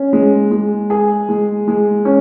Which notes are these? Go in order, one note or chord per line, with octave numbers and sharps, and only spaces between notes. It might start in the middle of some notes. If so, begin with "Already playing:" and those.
Already playing: C#4
G#3
G#3
G#4
G#3
G#3
C#4